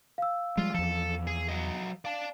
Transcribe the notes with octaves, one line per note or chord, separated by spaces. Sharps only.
F5 E6
F3 G3 G#3 F4
E2 F3 A4
G#4
F#3 D#5
D5 F5 A5